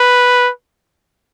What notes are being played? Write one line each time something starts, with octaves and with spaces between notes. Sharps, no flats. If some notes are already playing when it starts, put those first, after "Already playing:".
Already playing: B4